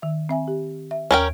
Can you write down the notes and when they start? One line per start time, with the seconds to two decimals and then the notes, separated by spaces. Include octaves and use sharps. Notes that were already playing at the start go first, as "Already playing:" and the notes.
0.02 D#3 E5
0.29 C4 E5 G#5
0.48 G4
0.91 E5
1.11 D#2 C#4 A#4 G5